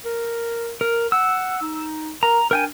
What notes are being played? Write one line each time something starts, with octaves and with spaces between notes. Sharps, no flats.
A#4
A#4
F#5 E6
D#4
A#4 A#5
D4 A#4 G5 G#5